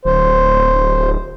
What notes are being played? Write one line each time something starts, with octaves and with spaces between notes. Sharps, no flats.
D1 C5